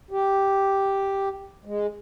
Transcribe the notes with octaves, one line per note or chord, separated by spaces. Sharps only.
G4
G#3